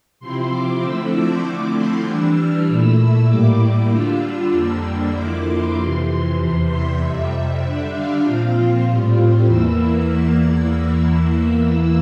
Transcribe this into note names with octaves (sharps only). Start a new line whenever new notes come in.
C3 F3 C4 E4 C6
D6
D3 F3 A3 C4 E4 E6
D6
D3 F3 A3 C4 E4
C6
E3 G3 D4 E6
F6
A#2 A3 E4 E6
E6
A2 G3 A#3 E4 D6
D3 G3 D4 F4 E6
E6
F2 D3 G3 A#3 D4 E6
F2 D3 F3 A#3 E4 D6
C6
F2 C3 E3 C6
E2 C3 E3
E5
F2 C3 G3
E5
D3 G3 D4
F5
A#2 F3 C4 F4 F5
A2 G3 C4 F4
E2 E3 A#3 E4 E6